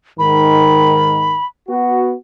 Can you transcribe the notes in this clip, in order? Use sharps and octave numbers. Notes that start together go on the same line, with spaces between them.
G#2 D#3 B5
B3 F#4